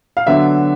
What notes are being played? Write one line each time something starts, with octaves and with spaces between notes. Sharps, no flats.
F5
D3 F#3 B3 E5